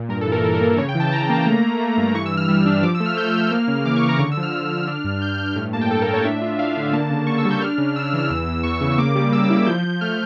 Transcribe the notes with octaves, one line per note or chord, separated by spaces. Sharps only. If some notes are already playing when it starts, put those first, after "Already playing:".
Already playing: A#2
G2 A#4
A4
E3
A#4
E3 A4
A#4
A#3
A#4
C#3 C#5
G5
E3
A5
C#3 A#5
A#3
A3
A3
A3
G2
E3 C#6
E6
E3
F6
G3 E6
D4
F3 D6
E6
A3
F6
A3 G6
F3
A#3 F6
C#3
E3 D6
C#6
C#3
A#5
D3 C#6
E6
F3
F6
F3
D3
D4
G2
D4 G6
F6
G2 G6
A2 F6
A#3 A5
G5
A2 A4
A#4
A2
C#5
D4 E5
F4
D4 F5
D3
A#3 A5
C#3
A#3 C#6
E6
G3
G6
D4 F6
C#3
C#3 E6
F6
E3
F6
E2 E6
E2
E2 C#6
C#3
A#3 D6
G3
A#3 E6
E4
F3 G6
F3
A3 F6